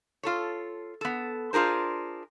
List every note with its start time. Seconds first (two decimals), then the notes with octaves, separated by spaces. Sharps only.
0.23 F4 A4 C#5
1.01 B3 A4
1.53 D4 F4 G#4 A#4 C5